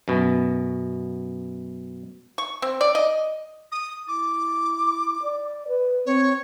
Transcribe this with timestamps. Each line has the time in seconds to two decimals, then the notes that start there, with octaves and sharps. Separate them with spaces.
0.08 F#2 B2
2.38 C#6
2.62 C4
2.81 D5
2.95 D#5
3.71 D#6
4.07 E4 D6
5.22 D5
5.67 B4
6.06 C4 C#5